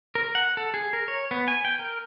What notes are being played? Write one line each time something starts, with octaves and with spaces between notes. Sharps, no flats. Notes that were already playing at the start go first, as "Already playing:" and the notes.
A#4
F#5
A4
G#4
A#4
C#5
B3
G#5
G5
A#4